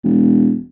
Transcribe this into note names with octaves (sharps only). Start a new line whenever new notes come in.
E1